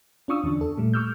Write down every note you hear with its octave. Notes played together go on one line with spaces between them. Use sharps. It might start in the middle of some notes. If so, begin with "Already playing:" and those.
C#4 D4 F4 C#6 D#6 E6
E2 D3 D4
A4
A#2 G3 A3
C#6 D6 E6 F6 G6